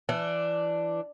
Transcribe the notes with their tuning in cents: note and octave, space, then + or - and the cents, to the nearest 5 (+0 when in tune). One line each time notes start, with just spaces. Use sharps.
E3 +25 D4 +0